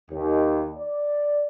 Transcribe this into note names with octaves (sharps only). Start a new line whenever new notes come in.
D#2
D5